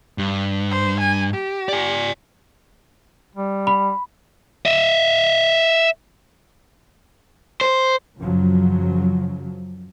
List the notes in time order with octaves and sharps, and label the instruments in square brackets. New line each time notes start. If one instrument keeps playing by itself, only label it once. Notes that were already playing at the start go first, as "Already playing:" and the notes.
[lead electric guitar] G2
[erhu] C5
G#5
G4
[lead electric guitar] D5 G#5
[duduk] G3
[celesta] B5
[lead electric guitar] D#5 E5
[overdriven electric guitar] C5
[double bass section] F#2 C#3 F3 F#3